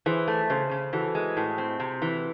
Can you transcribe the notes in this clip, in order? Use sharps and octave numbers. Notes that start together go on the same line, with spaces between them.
E3 G#4 C5
A3
C#3 G#4 C5
C#3
E3 F#4 A4
G#3
A2
C4
C3
E3